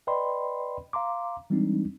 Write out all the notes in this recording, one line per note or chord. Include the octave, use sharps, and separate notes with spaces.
B4 D5 D#5 G5 B5 C6
F5 A#5 C6 D6
E3 G3 G#3 C4 D4 D#4